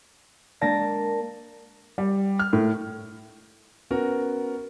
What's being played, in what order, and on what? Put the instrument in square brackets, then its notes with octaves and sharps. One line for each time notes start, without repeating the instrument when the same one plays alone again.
[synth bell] G#3 D4 D5 [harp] A#3 A5 A#6
[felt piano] G3
F6
A2
[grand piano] B3 C#4 F#4 A#4